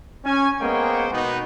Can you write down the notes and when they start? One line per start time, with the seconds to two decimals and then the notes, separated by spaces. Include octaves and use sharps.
0.24 C#4 G#5
0.60 G#3 A#3 B3 C5 C#5 G5
1.12 B2 B3 D#4